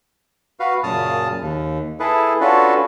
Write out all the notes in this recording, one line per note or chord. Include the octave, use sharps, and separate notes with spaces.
F#4 B4 F5
F#2 A#2 C#3 A5 D#6 F6
D#2
E4 G#4 A4 B4
C#4 D4 F4 F#4 A4 B4